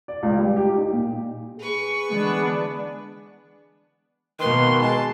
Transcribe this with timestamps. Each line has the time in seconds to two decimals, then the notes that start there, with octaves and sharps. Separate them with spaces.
0.08 D5
0.23 C#2
0.39 G3
0.56 G4
0.77 D#4
0.92 A#2
1.59 G#4 B4 C#6
2.10 D3 E3 G#3 B3 D4
4.40 B2 D#3 A#3 B4 C6
4.81 G#3 A5